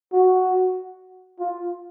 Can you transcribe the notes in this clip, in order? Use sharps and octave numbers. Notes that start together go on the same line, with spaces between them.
F#4
F4